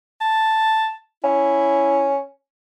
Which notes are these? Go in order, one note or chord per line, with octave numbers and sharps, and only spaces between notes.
A5
C#4 E4